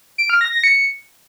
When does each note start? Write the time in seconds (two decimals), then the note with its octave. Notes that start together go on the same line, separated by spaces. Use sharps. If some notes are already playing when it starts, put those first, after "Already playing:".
0.18 D7
0.30 F6
0.41 A#6
0.52 A#6
0.64 C#7